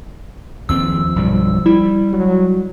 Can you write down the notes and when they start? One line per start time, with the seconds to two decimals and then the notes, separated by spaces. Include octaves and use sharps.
0.69 D#2 F3 C4 E6
1.16 B1 G2 G3
1.66 G3 E4
2.13 F#3